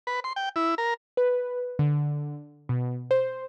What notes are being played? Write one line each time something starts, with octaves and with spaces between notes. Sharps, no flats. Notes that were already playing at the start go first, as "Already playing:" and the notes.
B4
C6
G5
E4
A#4
B4
D3
B2
C5